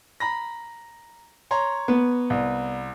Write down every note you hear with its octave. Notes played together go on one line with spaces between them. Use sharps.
A#5 B5 A#6
C#5 A#5 C6
B3
C2